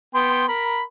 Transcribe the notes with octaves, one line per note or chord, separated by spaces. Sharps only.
B3 G5 C6
A#4 B5